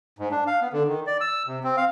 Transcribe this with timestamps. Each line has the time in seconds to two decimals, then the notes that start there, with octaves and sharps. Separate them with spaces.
0.19 G#2
0.31 D4
0.47 F5
0.62 B3
0.73 D3
0.88 D#3
1.07 D5
1.21 E6
1.47 C3
1.63 C4
1.77 F5